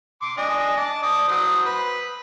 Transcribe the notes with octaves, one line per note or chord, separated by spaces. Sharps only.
C6 D6
D4 D#5 G#5
A5 D6
D5 A5 D#6
F#3 C5 D#6
B4